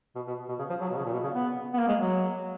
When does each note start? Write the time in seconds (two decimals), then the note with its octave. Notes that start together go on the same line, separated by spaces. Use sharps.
0.15 B2
0.27 B2
0.49 B2
0.59 C#3
0.69 F3
0.81 F#3
0.89 B2
0.96 C#3
1.05 A#2
1.12 B2
1.23 C#3
1.34 B3
1.74 B3
1.78 A#3
1.88 G#3
2.00 F#3